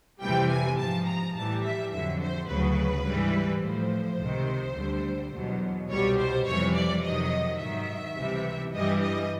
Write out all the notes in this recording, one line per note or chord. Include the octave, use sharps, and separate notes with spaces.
F2 C3 E3 G3 G5
G#5
G#2 F3 A5
A#5
A2 E3 G3 A5
E5
F2 D3 F#3 E5
C5
D2 C#3 F#3 B4
G#2 E3 G3
A2 F3 C5
C#2 C3 D#3
D2 D3 G3
E2 B2 F#3
C2 B2 G3 C#5
C5
F2 C3 E3 G3 C#5
D5
F2 C3 D#3 F#3 D#5
G#2 D#3 F#3 E5
C#2 C3 E3 G3
G2 E3 G3 D#5
D#5